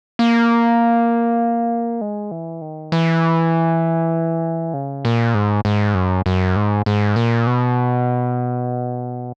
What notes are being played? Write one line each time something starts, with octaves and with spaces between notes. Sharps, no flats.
A#3
G#3
E3
D#3
E3
C#3
A#2
G#2
G#2
F#2
F#2
G#2
G#2
A#2
B2